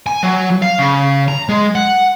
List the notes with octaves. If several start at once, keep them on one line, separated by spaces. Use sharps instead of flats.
G#5
F#3
F5
C#3
A#5
G#3
F#5